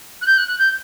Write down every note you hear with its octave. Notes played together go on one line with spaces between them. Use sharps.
F#6
G6
F#6
F#6
G6